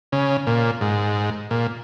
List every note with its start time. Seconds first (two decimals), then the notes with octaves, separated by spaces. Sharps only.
0.12 C#3
0.47 A#2
0.81 G#2
1.51 A#2